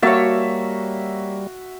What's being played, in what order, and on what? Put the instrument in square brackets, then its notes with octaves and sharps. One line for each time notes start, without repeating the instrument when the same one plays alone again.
[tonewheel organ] G3 [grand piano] A#3 [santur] F#4 E5 E6 [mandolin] C#5 A5